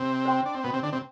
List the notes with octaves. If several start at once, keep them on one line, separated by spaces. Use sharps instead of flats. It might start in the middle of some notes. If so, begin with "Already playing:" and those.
Already playing: C3 C4
C5 G5 C6
D4
C4
B2 B3
C3 C4
D3 D4
C3 C4